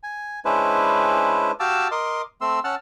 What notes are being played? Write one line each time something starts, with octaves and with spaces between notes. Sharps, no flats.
G#5
G#3 C#4 D4 E4 B4 C5
F#4 G4 F5 A5 D6 E6
A#4 D#5 C6 D6
A3 C4 C6 E6
C#4 F#5 A5 E6 F6